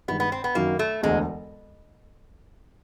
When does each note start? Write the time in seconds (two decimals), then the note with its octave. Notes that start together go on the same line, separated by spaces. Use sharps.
0.08 G2 D#3 G#3 B3
0.20 B3
0.32 C4
0.44 B3
0.55 F#2 D#3 F#3 A#3
0.79 A3
1.03 E1 D2 D3 G#3